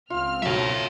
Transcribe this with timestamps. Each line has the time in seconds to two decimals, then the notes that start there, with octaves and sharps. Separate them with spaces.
0.10 C#2 C4 F4 F6
0.42 B1 F#3 C#5 E5